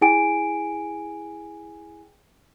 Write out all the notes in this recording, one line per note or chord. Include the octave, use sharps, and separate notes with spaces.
E4 G#4 G5 G#5 D7